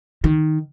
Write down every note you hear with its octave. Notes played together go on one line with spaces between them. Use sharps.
D#3